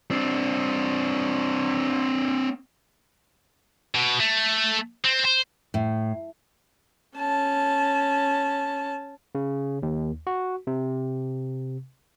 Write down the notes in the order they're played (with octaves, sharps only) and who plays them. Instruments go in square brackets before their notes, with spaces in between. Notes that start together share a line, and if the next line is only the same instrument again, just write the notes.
[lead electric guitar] C4 D4
[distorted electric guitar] B2
A3
C4
C5
[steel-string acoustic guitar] A2
[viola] C#4 A5
[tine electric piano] C#3
D#2
F#4
C3